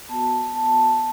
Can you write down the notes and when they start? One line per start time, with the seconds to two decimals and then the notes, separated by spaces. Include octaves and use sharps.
0.09 B3 F#4 A5
0.56 A5